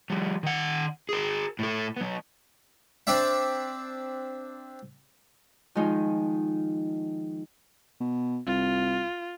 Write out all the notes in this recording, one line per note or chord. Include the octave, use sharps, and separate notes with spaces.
F3 G3
D#3 F#5
G#4 A#4
A2 A4
F#3 B3
C4 D4 D5 E5
D#3 F3 G#3 D#4
B2
C2 F4